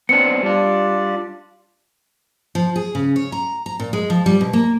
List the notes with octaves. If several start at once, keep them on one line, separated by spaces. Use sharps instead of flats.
B3 C4 D4 C#7
G3 D4 F4 D5
F3
G#4
C#3
C#5
A#5
A#5
A#2
G#3
F3
G3
B2
A#3